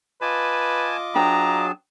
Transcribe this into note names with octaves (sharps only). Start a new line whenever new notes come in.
F4 B4 D#5 G#5 A5 D6
F#3 D4 G#4 B4 G5 A5 A#5